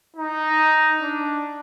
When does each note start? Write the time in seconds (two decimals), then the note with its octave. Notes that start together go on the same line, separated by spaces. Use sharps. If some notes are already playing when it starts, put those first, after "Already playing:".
0.17 D#4
1.02 D4